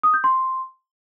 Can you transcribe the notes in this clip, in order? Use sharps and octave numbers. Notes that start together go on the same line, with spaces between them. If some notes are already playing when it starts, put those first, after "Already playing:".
D#6
G6
C6